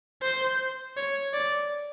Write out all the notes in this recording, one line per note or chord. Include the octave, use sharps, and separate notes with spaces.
C5
C#5
D5